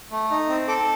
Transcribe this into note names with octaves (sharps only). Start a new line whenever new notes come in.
A3
D#4
C4
A4 D6